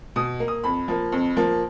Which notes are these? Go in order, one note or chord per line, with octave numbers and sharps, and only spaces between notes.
B2 D#6
A#3
D#6
F2 B5
F3 A#3
F2
F3 A#3